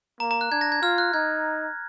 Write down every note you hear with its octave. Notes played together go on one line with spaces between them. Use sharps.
A#3 A#5
A#5
F#6
D4 G#6
A#6
G#6
F4 F6
F#6
D#4 G#6